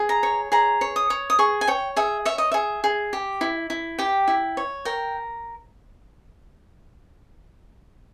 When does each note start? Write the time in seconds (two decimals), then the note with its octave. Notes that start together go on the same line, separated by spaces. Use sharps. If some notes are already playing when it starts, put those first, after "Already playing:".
Already playing: G#4
0.09 A#5
0.23 C#5
0.52 G#4 A#5
0.81 C#5
0.96 D#6
1.10 C#5
1.30 D#6
1.39 G#4 C#6
1.61 G#5
1.67 C#5 G5
1.96 G#4 E5
2.25 C#5 E5
2.38 D#5
2.52 G#4 E5
2.84 G#4
3.13 G4
3.41 E4
3.70 E4
3.98 G4 G5
4.28 E4
4.57 C#5
4.85 A#4 G5